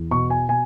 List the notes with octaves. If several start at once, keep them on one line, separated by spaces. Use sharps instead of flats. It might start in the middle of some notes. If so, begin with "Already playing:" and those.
Already playing: E2
B2 C#6
G#5
B2 G#5